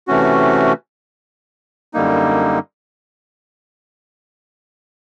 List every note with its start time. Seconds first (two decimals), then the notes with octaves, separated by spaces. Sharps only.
0.08 C3 E3 A3 C#4 F#4
1.94 F#2 D3 G3 A#3 D#4